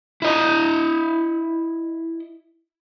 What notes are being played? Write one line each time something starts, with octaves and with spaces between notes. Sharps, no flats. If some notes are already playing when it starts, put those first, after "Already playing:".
E4 D#5